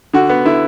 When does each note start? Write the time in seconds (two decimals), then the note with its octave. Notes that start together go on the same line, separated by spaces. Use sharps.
0.13 D3 F#4
0.30 B3
0.45 D3 E4